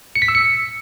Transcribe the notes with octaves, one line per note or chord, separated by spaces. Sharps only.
C#7
B6
E6
C#7